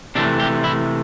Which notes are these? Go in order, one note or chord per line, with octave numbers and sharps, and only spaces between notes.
C3 E3 A3 D4
G4
E4